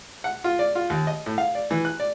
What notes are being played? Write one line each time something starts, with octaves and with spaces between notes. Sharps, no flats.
F#5
F4
D5
F4
D#2
D#5
A2
F5
D5
E3
F#6
D5